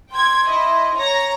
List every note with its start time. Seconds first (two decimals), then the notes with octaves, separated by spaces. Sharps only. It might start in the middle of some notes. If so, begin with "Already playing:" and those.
0.12 G5 C6 G#6
0.49 E4 D#5
0.97 C#5 A#5 A#6